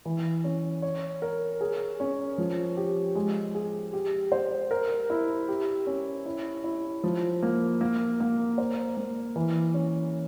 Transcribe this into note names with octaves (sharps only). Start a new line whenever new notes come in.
E3
C#4
C#5
A#4
G#4
C#4
F3
G4
G#3
G#4
G4
C5
A#4
E4
G4
C#4
E4
E4
F3
A#3
A#3
A#3
C5
A#3
E3
C#4